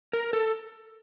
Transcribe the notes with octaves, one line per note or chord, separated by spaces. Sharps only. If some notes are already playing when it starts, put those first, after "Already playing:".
A#4
A4